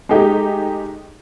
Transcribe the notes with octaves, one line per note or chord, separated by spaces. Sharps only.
G#3 A3 D#4 G4